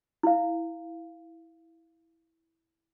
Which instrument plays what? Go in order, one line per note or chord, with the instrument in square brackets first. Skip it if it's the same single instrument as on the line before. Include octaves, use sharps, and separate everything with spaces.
[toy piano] E4 F5